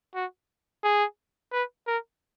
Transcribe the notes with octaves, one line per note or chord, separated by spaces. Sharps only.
F#4
G#4
B4
A#4